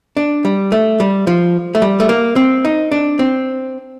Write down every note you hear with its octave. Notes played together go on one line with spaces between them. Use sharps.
D4
G3
A3
G3
F3
A3
G3
A3
A#3
C4
D#4
D4
C4